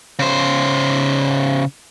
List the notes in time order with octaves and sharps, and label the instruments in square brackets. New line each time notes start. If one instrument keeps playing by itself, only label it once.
[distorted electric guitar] C#3 C5